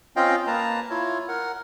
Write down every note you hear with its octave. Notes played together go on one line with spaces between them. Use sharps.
C4 C#4 F4 D#5 F5 G5
A#3 B4 A5 A#5
E4 F4 C#5
A#4 F#5